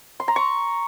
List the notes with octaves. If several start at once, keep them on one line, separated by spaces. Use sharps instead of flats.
C6
A#5
C#6